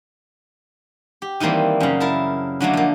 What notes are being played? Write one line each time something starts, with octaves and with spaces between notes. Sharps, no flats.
G4
D#3 E3 G3 A#3 C4
F#2 C#3
E4 A#4 A5
D3 F#3 A3 A#3
F3 A#3